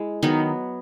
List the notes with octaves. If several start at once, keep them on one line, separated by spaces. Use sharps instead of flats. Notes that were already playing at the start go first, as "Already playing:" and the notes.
Already playing: G#3 E4
D#3 F#3 B3 D#4